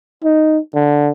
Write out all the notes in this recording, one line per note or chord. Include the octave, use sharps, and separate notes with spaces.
D#4
D3